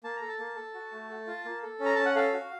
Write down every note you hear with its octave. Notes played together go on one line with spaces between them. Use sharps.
A#3 A5
A4 A#5
A5
A#3
A4
F#4
A3
A4
F4
A#3
A4
C#4
A#5
C#4 A5
F#5
A4 F5
F#4